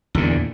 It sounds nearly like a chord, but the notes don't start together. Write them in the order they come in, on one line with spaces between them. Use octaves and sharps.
E2 D3 A#2